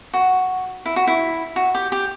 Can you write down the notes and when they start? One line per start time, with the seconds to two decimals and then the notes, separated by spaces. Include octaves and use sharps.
0.14 F#4
0.86 E4
0.96 F#4
1.07 E4
1.56 F#4
1.75 G4
1.92 G4